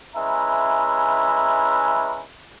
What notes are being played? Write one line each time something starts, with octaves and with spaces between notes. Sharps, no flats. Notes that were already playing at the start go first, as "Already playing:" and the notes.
G#3 C#4 E4 B4 E5 A#5